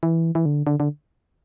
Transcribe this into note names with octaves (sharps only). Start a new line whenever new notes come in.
E3
E3
D3
D3
D3